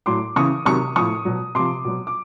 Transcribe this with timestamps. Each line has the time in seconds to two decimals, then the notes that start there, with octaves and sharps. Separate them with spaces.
0.06 A2 F#3 C6 D6
0.36 C#3 E3 C#6 D#6
0.66 C3 D#3 F#3 C#6 D#6
0.96 A2 F3 C#6 D#6
1.25 B2 F#3
1.55 C3 F3 C6 D6
1.85 B2 F#3
2.07 D6